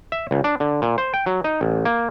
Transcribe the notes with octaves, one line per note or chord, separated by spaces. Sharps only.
E5
C#2
D4
D3
A#2
C5
G5
F#3
D#4
A1
A#3